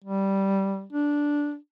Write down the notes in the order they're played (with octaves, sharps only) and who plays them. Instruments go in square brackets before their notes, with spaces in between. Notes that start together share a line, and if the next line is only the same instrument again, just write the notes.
[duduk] G3
D4